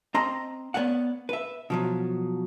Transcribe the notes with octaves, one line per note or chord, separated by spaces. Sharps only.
C4 D#5 A#5 C6
B3 C#5 D5 F#5
B4 E5
B2 F3 F#3